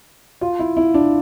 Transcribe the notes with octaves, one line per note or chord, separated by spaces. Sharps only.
F4
E4
E4
D4